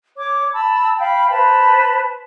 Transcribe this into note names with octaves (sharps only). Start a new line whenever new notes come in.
C#5 D6
A5 B5 E6
F5 G5 B5
B4 C5 A5 B5